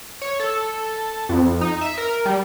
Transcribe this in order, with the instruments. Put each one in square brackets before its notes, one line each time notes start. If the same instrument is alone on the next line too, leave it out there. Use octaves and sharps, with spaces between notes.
[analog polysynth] C#5
A4
F2
D#4
E5
A#4
G3